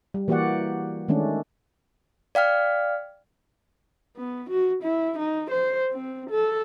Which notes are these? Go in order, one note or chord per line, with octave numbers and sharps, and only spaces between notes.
G3
E3 A#3 F#4 G4 D5 F#5
D#3 G#3 A3 C#4 D4
D5 F5 G5 F6
B3
F#4
E4
D#4
C5
C4
A4